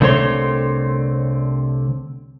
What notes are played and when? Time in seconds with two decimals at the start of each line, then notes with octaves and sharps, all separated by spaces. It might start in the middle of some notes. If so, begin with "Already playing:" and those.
0.01 C2 D3 A3 C4 C#5 C6